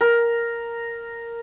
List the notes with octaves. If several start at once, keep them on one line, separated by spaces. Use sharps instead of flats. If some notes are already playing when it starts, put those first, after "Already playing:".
A#4